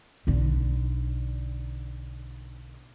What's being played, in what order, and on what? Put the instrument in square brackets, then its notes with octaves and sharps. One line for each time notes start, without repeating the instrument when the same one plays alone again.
[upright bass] B1 D3